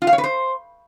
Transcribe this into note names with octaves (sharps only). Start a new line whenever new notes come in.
F4
F5
C#5
B4
C5